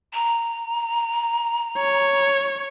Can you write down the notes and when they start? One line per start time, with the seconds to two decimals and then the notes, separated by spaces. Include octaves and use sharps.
0.14 A#5
1.78 C#5